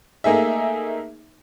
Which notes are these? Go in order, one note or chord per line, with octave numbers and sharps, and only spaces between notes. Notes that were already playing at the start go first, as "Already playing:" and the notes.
A3 A#3 D#4 G#4 E5